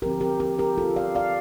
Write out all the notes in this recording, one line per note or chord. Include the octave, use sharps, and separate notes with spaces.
D3 F3 C4 G4 A#4
G4 A#4
G4 A#4
G4 A#4
F4 A4
D5 F5
D5 F5